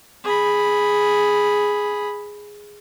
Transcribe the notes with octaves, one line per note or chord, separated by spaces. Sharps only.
G#4 B5